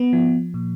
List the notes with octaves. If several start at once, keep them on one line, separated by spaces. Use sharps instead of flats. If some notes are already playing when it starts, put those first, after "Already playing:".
Already playing: B3
F3
A#2